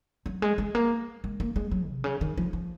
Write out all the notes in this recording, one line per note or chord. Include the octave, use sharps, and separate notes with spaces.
F#3
G#3
G#3
A#3
G#3
A#3
G#3
F#3
C3
C#3
D#3
F3
F3